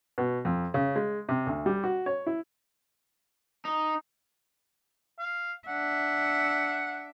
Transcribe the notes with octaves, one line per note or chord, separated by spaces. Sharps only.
B2
F2
C#3
G#3
C3
D2
G3
F#4
C#5
E4
D#4
F5
D4 E5 F#5